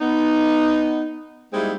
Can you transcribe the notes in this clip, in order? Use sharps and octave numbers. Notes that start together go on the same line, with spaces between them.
B3 D#4
G3 G#3 A#3 C4 D#4 E4